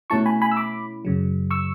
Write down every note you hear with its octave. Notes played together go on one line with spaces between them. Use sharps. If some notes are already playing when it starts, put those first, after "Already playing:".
B2 A3 C#4 E4 A5 C#6
G#5 B5
G#5 B5
E6
B5 D6
F#2 C#3 F#3
C#6 E6